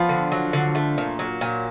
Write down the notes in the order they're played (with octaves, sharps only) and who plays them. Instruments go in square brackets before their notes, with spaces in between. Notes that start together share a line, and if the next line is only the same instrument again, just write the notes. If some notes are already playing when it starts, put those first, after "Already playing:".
Already playing: [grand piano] F3 F4 [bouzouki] B3
[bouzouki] D3
F#3
D3
A3
A#2
F#3
A#2